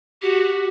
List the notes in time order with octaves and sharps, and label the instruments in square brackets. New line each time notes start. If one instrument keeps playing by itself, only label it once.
[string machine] F#4 [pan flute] G4